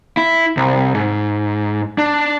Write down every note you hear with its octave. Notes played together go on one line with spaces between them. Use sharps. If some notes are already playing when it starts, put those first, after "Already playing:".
E4
C2
G#2
D4